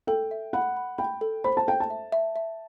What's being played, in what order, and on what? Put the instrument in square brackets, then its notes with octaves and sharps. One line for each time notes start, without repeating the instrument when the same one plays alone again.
[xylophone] A4 [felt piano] G5
[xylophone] E5
[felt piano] F#5 [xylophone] B5
[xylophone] B5
[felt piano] G5 [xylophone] B5
[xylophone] A4
[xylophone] C5 [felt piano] B5
[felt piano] A5
[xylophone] A4 [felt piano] G5
[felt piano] A5
[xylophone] E5
E5
E5